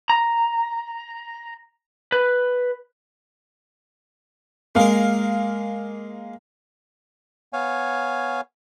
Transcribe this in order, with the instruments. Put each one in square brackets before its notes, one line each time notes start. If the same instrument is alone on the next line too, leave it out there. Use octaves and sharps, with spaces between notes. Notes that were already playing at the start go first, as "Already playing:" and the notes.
[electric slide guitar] A#5
B4
[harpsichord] G#3 A#4 [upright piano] A#3 F5
[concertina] B3 C#5 F5 G#5